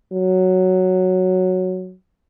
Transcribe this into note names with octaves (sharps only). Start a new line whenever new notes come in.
F#3